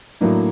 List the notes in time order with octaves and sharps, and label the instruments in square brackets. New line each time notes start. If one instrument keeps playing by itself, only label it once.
[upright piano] A2 F#3 A#3 D4